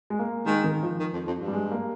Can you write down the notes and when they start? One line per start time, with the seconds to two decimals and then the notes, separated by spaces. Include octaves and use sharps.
0.10 G#3
0.19 A#3
0.46 D#3 G#3
0.64 D#3
0.83 F3
1.00 D#3
1.13 F2
1.27 F2
1.40 G2
1.48 G3
1.53 G#3
1.72 A#3